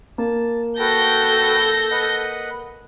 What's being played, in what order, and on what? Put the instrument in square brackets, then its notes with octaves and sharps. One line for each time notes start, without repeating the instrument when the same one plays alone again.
[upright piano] A#3 [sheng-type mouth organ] A5
[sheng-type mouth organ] F#4 B4 G5 [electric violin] A4 [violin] G6 A#6
[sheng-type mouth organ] B4 D#5 F#5